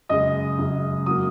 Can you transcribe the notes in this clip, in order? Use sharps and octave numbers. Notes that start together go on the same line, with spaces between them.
F#2 C#3 G#3 D#5 D#6
F#2 C#3 G#3
F#3 A#3 D#6